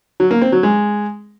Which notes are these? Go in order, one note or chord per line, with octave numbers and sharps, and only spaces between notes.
F#3
A#3
C4
F#3
G#3